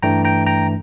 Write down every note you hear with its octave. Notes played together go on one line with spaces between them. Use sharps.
G2 E3 A3 D4 G5 A#5
G5 A#5
G5 A#5